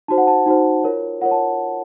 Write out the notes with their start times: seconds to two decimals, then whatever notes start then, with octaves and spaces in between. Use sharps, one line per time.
0.08 D#4 F#4 C5 A5
0.18 F#5
0.27 A5
0.46 D#4 F#4 C5
0.84 F4 A#4 C#5
1.21 F4 A#4 C#5 F#5
1.31 A5